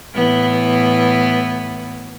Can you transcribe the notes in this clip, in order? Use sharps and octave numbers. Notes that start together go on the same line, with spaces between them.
A2 E3 B3